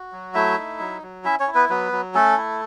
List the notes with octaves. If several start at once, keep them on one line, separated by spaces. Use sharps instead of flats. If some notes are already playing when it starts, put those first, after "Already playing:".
Already playing: F#4
F#3
A3 E4 E5
D#4
F#3
F#3
C#4 E4 E5
C#4 C#5
E4
B3 B4
F#3 B3 B4
F#3
A3 C#4 A4
E4